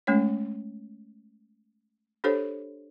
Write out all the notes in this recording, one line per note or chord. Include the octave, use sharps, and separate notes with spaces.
G#3 A3 C#4 C#5
D4 G4 A4 C5 C#5